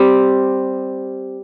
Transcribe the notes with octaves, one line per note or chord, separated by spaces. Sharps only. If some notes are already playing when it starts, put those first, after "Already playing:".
Already playing: G3 C4